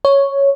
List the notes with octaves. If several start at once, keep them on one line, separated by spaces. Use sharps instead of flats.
C#5